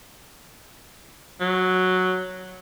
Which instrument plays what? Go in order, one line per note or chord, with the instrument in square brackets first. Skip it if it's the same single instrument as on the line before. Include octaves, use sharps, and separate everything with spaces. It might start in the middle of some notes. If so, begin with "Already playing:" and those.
[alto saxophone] F#3